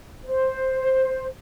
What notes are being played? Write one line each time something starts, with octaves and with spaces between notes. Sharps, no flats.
C5